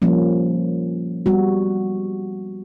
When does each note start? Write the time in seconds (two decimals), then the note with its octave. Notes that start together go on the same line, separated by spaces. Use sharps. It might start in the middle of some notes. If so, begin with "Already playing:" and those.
0.02 F3 G3 A#3 C#4
1.26 G3 B3 F#4